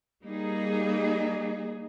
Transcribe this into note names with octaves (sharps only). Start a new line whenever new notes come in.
G3 A#3 D#4 G#4